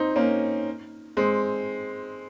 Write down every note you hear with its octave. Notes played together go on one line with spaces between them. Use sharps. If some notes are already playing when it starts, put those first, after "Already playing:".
Already playing: C4 D#4
A#3 C#4
G#3 C4